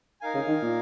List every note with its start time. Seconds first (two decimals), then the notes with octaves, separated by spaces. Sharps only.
0.21 D#4 A#4 F5 G#5
0.34 C#3
0.48 D#3
0.62 A#2